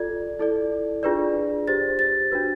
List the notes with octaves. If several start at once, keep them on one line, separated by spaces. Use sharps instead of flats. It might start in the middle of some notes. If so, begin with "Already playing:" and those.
Already playing: F4 A4 D5 G#6
E4 A4 D5
D4 F4 G#4 B4 D5
G4 C5 A6
A6
D4 F#4 B4